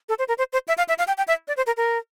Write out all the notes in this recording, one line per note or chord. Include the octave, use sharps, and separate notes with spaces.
A4
C5
A#4
C5
C5
E5
F5
E5
F5
G5
G5
E5
D5
C5
A#4
A#4